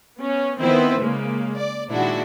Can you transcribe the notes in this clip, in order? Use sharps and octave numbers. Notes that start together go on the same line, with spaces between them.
B3 C#4
D#3 B3 C4 E4 B4 C5
C#3 G#3 A#3
D5
A#2 D#3 G#3 D4 E4 F#4